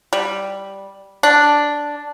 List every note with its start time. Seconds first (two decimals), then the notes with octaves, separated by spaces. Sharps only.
0.13 G3
1.23 D4